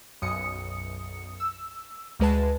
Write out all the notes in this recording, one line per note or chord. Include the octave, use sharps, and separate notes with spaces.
B1 F#2 D#6 C#7
E6
D2 G#3 B4 A5